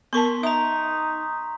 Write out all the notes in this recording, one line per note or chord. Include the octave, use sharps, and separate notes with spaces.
B3 A#4 A5 C6 C#6 B6
D#4 E5 A#5 D#6